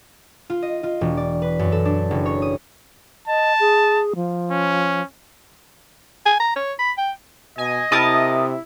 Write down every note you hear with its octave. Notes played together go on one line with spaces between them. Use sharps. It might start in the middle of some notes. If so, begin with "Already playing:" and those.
F4
D#5
F4
E1
D5
B4
F#2
A4
D4
F#1
C#5
D#6
D#5 A5
G#4
F3
C#4
G#5
A#5
C#5
B5
G5
B2 D#5 G#5
C3 E4 A#4 A5 D#6